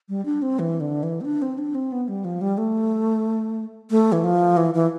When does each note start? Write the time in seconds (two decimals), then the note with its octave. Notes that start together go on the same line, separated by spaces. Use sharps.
0.09 G3
0.26 D4
0.42 C4
0.59 E3
0.80 D3
1.03 E3
1.21 C4
1.25 D4
1.42 C4
1.58 D4
1.75 C4
1.92 B3
2.08 G3
2.25 F3
2.41 G3
2.58 A3
3.90 A3
4.12 E3
4.24 F3
4.57 E3
4.74 E3